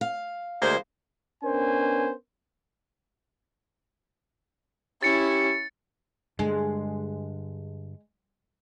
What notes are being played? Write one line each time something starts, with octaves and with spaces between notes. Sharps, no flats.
F5
D2 G#3 A#3 C5
B3 C#4 D4 A#4 C5 G#5
C#4 E4 G4 A6 C#7
G2 D3 G#3